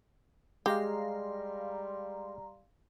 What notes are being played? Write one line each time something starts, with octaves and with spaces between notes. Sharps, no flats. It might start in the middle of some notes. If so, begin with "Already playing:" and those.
G3 G#3 G4 F5 A#5 C6